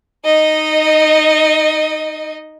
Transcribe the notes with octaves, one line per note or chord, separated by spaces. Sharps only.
D#4 D#5